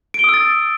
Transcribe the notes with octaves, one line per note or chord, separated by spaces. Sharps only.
D#6 E6 A6 D7 G7